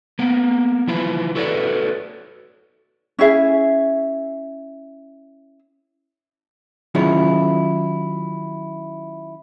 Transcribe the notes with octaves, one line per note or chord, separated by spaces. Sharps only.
A#3 B3
E3 F3 E4 F4
F#4 A4 B4 C#5 D5
C#4 E4 G#4 E5
D#3 F#3 C#4 E4 F4 G#4